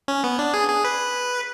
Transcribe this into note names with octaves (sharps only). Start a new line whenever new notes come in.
C#4
B3
D4
G#4
G#4
B4